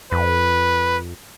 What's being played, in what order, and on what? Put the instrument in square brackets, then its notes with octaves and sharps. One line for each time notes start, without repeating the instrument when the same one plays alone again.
[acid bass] F2 [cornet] B4